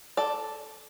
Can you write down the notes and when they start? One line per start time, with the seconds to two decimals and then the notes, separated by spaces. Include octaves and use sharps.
0.17 A4 D5